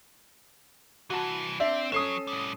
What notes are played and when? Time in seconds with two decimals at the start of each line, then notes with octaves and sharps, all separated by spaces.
1.10 C2 E3 F#4 A5
1.60 C4 D4 E5
1.92 F#3 C#4 A4 D#6 C7 E7
2.27 A2 G3